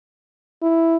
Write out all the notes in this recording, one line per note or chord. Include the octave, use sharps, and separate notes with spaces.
E4